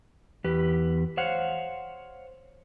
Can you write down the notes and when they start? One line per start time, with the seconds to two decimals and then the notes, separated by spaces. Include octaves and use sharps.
0.44 E2 G4 B4
1.17 C5 C#5 F5 F#5